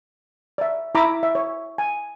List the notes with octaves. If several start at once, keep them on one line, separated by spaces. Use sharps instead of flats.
D5 E5
E4 E5 A#5 B5 D6 E6
E5
C#5
G#5